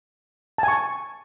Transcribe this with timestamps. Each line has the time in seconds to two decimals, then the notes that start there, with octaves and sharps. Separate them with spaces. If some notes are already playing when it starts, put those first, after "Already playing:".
0.58 A5
0.63 G#5
0.68 C#6